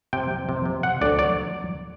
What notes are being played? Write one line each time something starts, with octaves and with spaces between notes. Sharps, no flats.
C3 G5
C3
C3
C3
C3 F#5
D2 D5
F#3 D5